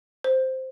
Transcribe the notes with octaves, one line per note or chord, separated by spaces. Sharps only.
C5